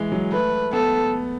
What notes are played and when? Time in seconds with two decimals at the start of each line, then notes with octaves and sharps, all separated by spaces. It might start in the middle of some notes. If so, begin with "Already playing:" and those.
Already playing: E3 G#3
0.12 F#3
0.32 A3 B4
0.73 B3 A4